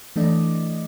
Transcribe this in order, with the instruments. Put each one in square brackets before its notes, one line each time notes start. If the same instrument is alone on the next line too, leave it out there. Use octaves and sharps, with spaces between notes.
[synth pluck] E3 A3 D4 D5 D#5